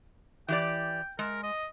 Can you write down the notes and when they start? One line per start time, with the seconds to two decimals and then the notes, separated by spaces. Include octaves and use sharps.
0.48 E3 G4 D5 G5
1.19 G#3 A#4
1.43 D#5